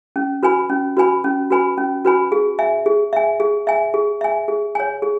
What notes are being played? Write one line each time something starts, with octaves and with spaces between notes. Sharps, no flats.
C#4
F#4 B4 G#5 B5
C#4
F#4 B4 G#5 B5
C#4
F#4 B4 G#5 B5
C#4
F#4 B4 G#5 B5
G#4
E5 G#5
G#4
E5 G#5
G#4
E5 G#5
G#4
E5 G#5
G#4
C#5 G#5
G#4